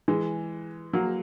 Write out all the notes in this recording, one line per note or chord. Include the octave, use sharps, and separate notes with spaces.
E3 G#3
F#3 A#3